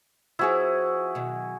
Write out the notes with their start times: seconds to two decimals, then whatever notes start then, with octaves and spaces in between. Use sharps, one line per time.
0.39 F3 C4 E4 F#4 G#4 C#5
1.15 B2 D#3 F#3